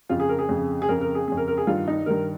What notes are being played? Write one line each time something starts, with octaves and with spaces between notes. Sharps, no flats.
F2 C#3 F4
G#4
A#4
G#4
F2 C#3
G#4
F2 C#3 A#4
A#4
G#4
F2 C#3 G#4
A#4
A#4
G#4
G2 D#3 F4
D#4
G2 D#3 A#4